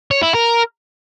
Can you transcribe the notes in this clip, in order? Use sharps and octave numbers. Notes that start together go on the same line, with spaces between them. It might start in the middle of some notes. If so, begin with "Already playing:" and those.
C#5
E4
A#4